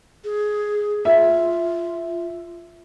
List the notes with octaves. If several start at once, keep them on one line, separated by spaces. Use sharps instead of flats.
G#4
F4 E5